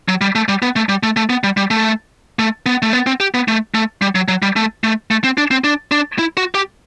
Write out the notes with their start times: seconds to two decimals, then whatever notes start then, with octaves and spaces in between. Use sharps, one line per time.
0.08 F#3
0.21 G3
0.35 A3
0.48 G3
0.62 B3
0.76 A3
0.89 G3
1.03 A3
1.17 A3
1.30 B3
1.44 G3
1.57 G3
1.71 A3
2.39 A3
2.66 B3
2.82 A3
2.93 B3
3.07 C4
3.20 G4
3.34 B3
3.48 A3
3.74 A3
4.02 G3
4.15 F#3
4.28 F#3
4.42 G3
4.56 A3
4.84 A3
5.11 A3
5.24 C4
5.38 D4
5.51 C4
5.64 D4
5.91 D4
6.19 E4
6.37 F#4
6.55 G4